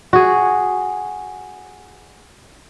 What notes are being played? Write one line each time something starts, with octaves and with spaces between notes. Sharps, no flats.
F#4 G#4